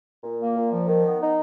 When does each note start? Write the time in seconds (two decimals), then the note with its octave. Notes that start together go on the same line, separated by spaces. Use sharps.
0.23 A#2
0.40 A#3
0.56 A#2
0.72 F3
0.88 D#3
1.05 B3
1.21 D#4